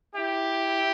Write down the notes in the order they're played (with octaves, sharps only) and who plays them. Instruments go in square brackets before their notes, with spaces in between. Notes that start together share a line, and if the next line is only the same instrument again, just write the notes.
[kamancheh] E4 [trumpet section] G4